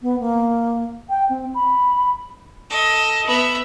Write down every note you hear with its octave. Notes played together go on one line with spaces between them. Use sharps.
B3
A#3
G5
C4
B5
A4 D#5
B3 E5